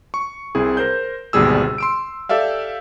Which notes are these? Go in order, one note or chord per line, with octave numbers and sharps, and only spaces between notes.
C#6
C2 C4 E4 G#4
A#4 C5 G6
G#1 D2 B2 G3 G#4 E6
C6 E6 D7
G4 A4 D5 E5 F5